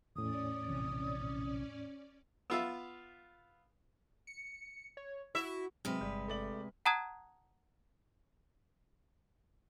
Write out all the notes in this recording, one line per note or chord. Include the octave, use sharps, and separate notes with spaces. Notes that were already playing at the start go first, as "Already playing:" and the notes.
E2 A2 C#4 D5 D#6
A#1 C3 E3
B3 F4 E5
C#7
C#5
E4 F#4 E5
C3 F#3 G#3 C4 B4 F6
G1 G3
A3 D5 F#7
F#5 A5 A#5 D#6 F#6 G#6